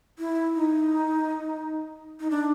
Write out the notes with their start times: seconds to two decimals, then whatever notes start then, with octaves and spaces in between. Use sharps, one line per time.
0.19 E4
0.55 D#4
2.20 D#4
2.30 D4